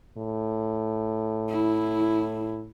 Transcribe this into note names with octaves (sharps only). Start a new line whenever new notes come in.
A2
E4